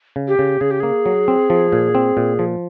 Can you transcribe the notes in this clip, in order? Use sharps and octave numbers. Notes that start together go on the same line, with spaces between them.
C#3
G4
C#3
C#3 G#4
G4
A#3 G#4
F#3
C4
F3
A#2
C4
A#2
F3